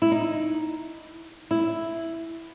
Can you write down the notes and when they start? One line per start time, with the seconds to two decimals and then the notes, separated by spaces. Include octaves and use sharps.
0.02 E4
0.12 D#4
1.51 E4